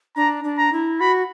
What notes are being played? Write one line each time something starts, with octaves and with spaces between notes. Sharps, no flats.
D4 A#5
D4
A#5
E4
F#4 B5